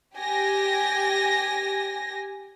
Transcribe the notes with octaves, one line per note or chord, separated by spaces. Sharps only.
G4 G#5 A#6